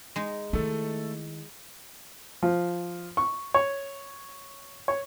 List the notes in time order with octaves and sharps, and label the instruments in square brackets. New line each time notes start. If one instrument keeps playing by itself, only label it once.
[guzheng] G#3 D#4
[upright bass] D#3 E4 [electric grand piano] A3 A4
[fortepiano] F3
C#6
C#5
C#5